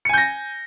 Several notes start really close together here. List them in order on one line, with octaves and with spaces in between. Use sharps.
C#7 G#5 G6 A#6